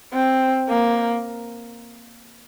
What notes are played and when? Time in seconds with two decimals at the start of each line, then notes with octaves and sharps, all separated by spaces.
0.13 C4
0.69 A#3